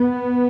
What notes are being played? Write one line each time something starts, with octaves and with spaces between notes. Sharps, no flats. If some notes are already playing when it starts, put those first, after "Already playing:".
Already playing: B3